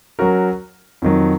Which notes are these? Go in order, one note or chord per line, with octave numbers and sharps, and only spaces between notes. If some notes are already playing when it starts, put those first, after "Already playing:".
F#3 C#4 F#4 A#4
F2 D#3 F#3